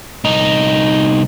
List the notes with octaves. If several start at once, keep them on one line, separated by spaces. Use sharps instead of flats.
C2 D#4